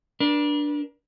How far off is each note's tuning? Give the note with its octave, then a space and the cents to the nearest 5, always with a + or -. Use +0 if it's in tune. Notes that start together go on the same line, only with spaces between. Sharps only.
D4 +0 B4 -45